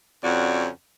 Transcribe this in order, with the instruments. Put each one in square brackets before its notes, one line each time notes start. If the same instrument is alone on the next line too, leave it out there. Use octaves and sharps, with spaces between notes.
[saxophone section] F2 C#3 C#4 F#4 D5 F#5